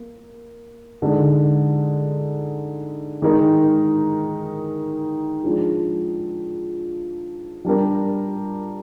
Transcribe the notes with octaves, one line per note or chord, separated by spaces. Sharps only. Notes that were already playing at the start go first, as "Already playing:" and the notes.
Already playing: A#3
D3 G#3 D#4
D#3 G#3 D#4 A#4
F3 G#3 D4 G#4
G3 D4 G4 A#4